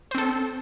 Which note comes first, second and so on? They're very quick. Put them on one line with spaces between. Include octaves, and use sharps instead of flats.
C5 C4 A4